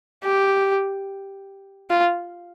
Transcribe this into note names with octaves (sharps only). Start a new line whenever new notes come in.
G4
F4